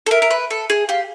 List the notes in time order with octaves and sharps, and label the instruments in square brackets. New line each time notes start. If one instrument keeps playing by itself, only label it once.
[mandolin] A4
[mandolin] A#4 [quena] E5
[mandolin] A#4
B4
A4
G#4
[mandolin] G4 [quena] F5